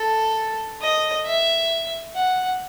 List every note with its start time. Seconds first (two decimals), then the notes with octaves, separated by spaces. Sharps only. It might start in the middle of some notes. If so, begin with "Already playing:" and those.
Already playing: A4
0.81 D#5
1.26 E5
2.16 F#5